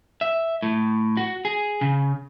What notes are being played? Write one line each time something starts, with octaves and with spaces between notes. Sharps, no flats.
E5
A2
F#4
G#4
C#3